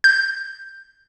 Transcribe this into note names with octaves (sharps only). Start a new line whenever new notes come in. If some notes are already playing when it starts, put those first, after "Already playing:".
G6